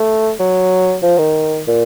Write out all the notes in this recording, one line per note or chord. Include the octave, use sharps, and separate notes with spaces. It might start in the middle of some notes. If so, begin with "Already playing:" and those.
Already playing: A3
F#3
F3
D#3
A#2